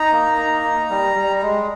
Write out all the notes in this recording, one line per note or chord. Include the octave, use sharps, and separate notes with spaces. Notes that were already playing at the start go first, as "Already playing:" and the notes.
Already playing: D#4 A#5
A#3
D#4
D#4
G3
G3
G#3